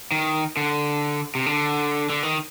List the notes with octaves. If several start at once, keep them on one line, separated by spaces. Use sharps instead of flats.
D#3
D3
C3
D3
D3
D#3